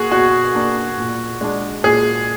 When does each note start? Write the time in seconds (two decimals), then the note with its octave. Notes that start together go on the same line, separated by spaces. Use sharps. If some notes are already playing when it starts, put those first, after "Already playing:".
Already playing: A#3 F#4 G#4
0.11 B2 F#4
0.55 A#3 D4
0.98 A#2
1.41 G#3 D4
1.84 A#2 G#4